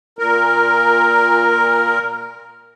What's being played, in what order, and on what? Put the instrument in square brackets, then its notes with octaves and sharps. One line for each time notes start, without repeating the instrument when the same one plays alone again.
[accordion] A#2 A#4